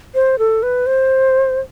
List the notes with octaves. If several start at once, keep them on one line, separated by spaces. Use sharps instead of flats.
C5
A4
B4
C5